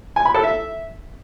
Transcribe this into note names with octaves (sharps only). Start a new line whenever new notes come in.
G#5
B5
A4
E5